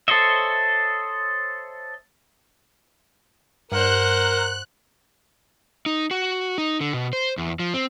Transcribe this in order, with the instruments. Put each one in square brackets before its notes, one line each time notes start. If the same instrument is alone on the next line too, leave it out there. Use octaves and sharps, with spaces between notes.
[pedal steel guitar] A4 C5 C#5 D#5 E5
[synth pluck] G2 [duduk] A#4 [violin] C5 F#5 [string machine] F#6
[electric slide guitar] D#4
F#4
D#4
D3
B2
C5
E2
F3
C4